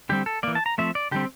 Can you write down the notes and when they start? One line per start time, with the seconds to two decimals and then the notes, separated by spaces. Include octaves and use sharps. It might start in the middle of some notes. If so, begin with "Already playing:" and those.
0.09 D3 G3 C4 G4
0.26 A4
0.43 E3 A#3 D5
0.55 A5
0.66 A#5
0.78 F3 A3 C4 E5
0.95 D5
1.11 D3 G3 C4 G4